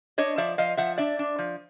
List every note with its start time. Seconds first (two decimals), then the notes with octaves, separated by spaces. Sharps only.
0.18 D4 C#5 D#5
0.38 F3 D5 E5
0.58 F3 D#5 F5
0.77 F3 E5 F#5
0.98 D4 D5 E5
1.19 D4
1.39 F3